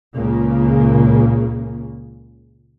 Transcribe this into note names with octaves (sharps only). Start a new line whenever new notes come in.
C#2 A#2 C#3 A#3